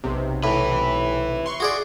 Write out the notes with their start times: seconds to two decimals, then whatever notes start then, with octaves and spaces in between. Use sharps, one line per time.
0.04 B1 C3
0.44 A2 E4 B4
1.46 C6 C#6
1.60 F#4 G#4 D5